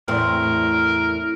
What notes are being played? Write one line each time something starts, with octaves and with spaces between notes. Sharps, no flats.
E2 A2 C4 A#4